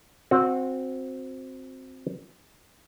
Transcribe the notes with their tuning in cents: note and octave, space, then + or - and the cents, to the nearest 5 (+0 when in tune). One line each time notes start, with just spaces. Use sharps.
C4 +0 F#4 -25